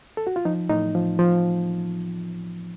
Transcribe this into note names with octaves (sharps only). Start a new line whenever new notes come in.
A4
F#4
F4
F3 D#4
A2 D#4
F3
F3